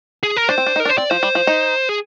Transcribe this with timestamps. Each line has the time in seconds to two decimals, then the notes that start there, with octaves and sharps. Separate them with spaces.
0.23 G#4
0.37 A#4
0.49 D4 C5
0.58 C4
0.66 D4
0.76 D#4
0.80 A#4
0.85 D4
0.89 C5
0.97 C4 D5
1.10 F3 C5
1.23 G3
1.35 F3
1.47 D#4
1.89 G#4